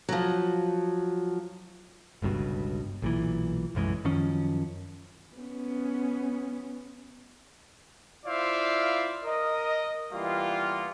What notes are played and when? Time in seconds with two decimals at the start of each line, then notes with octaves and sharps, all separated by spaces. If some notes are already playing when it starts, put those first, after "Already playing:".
0.09 F3 F#3
2.22 G1 C#2 G2 B2
3.02 B1 A#2 E3
3.75 B1 F#2 E3 G#3
4.04 F#2 D#3 F3 C#4
5.37 B3 C#4
8.25 E4 F4 C5 D5 E5 F5
9.25 A#4 D#5
10.12 E3 G3 A#3 B3 F4